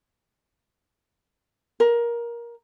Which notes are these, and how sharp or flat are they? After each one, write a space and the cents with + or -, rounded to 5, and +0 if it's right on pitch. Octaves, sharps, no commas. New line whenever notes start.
A#4 +15